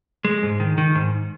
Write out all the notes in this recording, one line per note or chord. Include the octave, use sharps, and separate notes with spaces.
G#3
G#2
D#3
D#3
G#2